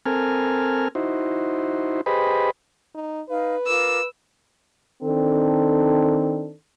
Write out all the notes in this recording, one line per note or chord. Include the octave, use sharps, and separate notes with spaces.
C4 A4 A#4 G#5 F6
D#4 E4 F#4 C5
G4 G#4 B4 C5 D#5 B5
D#4
D#4 B4 F5
F4 A#4 D6 E6
D#3 C4 D4 A4